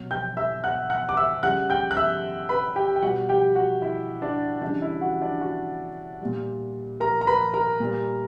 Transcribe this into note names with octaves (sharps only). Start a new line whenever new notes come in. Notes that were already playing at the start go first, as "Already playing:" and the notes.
Already playing: B2 F#3
G5 G6
E5 E6
F#5 F#6
F#5 F#6
D6
E5 E6
C#3 G3 F#5 F#6
G5 G6
F#6
E5 E6
B4 B5
G4 G5
G5
B2 G3 F#4 F#5
G4 G5
F#4 F#5
E4 E5
D4 D5
C#3 E3 G3 D4 D5
E4 E5
F#4 F#5
D4 D5
F#4 F#5
A#2 G3
A#4 A#5
A#5
B4 B5
A#4 A#5
A#2 G3